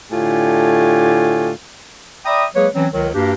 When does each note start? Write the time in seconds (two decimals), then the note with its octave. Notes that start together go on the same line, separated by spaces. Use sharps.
0.11 A2 D3 A3 F4 G4 G#5
2.25 D5 E5 G5 A#5 B5 D#6
2.55 F#3 G#3 A#3 G#4 B4 C#5
2.75 E3 F#3 C4 C#4
2.93 C#2 D#3 F#3
3.14 G2 A#3 D4 F#4 G4